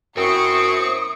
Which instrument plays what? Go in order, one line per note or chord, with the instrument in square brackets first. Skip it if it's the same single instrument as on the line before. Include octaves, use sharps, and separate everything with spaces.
[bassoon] F#2 [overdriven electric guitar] C4 [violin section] E4 C#6 C#7 [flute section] D#6